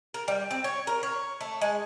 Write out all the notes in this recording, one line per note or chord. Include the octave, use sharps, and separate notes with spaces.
A#4
G3
C4
C#5
A#4
C#5
A3
G#3